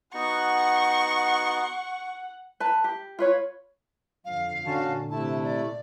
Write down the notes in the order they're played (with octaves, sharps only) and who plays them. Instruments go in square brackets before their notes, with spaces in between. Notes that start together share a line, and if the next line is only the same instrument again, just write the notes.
[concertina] B3 D#4 F#4 [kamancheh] F#5 [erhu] C#6
[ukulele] B4 A5
G4
F4 B4 C#5
[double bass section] F2 D3 F3 [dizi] F5
[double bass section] A#2 [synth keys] D3 [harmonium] C#4 F#4 A5
[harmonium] C3 A3 E4 [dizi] A5
[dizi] D5